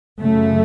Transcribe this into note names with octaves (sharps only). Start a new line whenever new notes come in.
F#2 C#3 A3